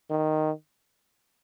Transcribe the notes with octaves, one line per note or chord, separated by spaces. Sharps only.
D#3